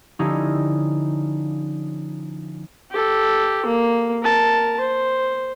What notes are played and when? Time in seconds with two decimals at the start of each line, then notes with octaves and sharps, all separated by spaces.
0.19 D3 F3 C#4 D#4 E4 G4
2.91 G4 A4
3.66 A#3
4.23 A#4 A5
4.80 C5